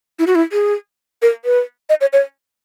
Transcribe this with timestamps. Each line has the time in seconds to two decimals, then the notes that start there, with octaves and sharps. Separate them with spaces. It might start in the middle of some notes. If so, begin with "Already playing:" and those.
0.19 E4
0.27 F#4
0.35 E4
0.52 G#4
1.22 A#4
1.45 B4
1.89 D#5
2.01 C#5
2.13 C#5